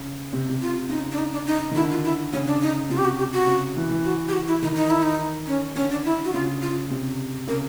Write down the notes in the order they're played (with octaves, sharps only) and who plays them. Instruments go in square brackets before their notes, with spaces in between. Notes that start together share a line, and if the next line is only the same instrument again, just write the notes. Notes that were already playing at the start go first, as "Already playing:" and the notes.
Already playing: [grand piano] C#3
C3
C3
[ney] F4
[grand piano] C#3 [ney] D#4
[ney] D4
D#4
D4
D#4
[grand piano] D#3
[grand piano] D3 [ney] E4
[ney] F4
E4
[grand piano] C#3 [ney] C#4
[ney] D4
D#4
[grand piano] C3 [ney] F4
[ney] G4
F#4
G4
F#4
[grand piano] C#3
E3
E3
[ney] F#4
G4
F#4
E4
[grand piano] D#3 [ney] D#4
[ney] D#4
E4
D#4
C#4
[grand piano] D3 [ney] C#4
[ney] D4
E4
F#4
[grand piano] C#3 [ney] F4
[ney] F4
[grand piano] C3
[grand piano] C#3 [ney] A#4